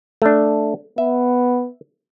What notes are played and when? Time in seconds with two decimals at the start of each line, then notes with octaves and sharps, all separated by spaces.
0.22 A3 D4
0.98 B3 E5